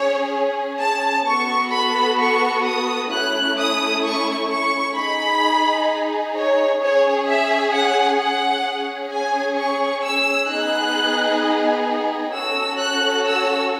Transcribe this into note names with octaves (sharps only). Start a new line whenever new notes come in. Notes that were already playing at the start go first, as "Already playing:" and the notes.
Already playing: C#4 G#4 C#5
A5
B3 F#4 A4 C#6
B5
C#6
D#6
A3 C#4 E4 F#6
D#6
C#6
C#6
D#4 G#4 B5
C#5
C#4 G#4 C#5
E5
F#5
F#5
C#4 G#4
G#5
C#6
E6
B3 D#4 G#4 F#6
C#4 F#4 A4 E6
F#6
E6